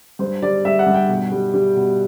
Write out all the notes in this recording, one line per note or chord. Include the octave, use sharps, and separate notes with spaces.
G2 C5
G3 D5
G2 E5
F#5
G2
G5
B2
G3
G3
B2